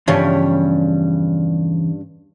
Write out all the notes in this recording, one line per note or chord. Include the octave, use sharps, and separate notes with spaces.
E2 G2 C#3 F3 G3 C#4